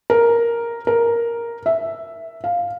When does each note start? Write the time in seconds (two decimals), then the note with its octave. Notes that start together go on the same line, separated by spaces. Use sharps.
0.10 A#4
0.87 A#4
1.66 E5
2.44 F5